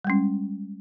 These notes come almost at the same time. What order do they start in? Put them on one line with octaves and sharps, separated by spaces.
G3 G#3 C#4